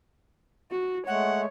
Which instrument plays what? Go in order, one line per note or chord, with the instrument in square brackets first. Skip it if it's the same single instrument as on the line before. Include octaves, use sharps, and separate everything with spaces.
[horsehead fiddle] F#4
[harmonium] G#3 A3 [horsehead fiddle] C#5 [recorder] F#5